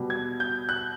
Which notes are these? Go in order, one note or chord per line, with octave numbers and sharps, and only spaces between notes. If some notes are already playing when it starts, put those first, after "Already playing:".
Already playing: B2 G3
G#6
G6
F#6